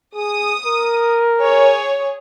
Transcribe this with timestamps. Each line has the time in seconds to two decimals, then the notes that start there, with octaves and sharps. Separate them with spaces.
0.15 G#4 D#6
0.66 A#4
1.38 G#4 C#5